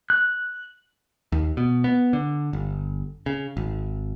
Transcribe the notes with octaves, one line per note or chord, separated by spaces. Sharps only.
F#6
D#2
B2
B3
D3
G1
C#3
G#1